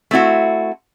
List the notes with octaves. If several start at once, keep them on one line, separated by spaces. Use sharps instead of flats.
A3 C4 E4 F#4